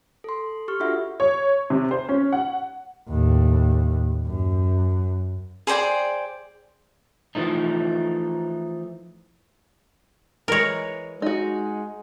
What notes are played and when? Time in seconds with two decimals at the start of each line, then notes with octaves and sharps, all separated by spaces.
0.24 A4 C6
0.68 G4 C#6 F6
0.80 D4 F4 F#4 A4 E5 F#5
1.20 C#5
1.70 C3
1.91 C5
2.09 C#4
2.33 F#5
3.08 D#2 A2
4.26 F#2
5.67 G#4 C5 D5 G5
7.35 E3 F3 A3 D#4
10.48 E3 G#3 A#4 C#5
11.22 G#3 D#4 F#4